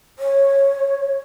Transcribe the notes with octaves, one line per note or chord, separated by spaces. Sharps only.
C#5